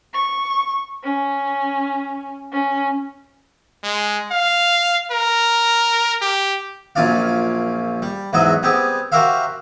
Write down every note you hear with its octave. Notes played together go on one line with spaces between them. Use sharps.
C#6
C#4
C#4
G#3
F5
A#4
G4
A#1 F#2 C#4 F4 D5 F5
G3
E2 G#2 F#3 F#4 D#5 E5
G3 B3 C4 G4 G#4
F#4 G4 A#4 C5 E5 F5